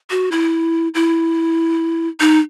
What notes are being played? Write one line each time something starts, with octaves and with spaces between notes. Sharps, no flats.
F#4
E4
E4
D#4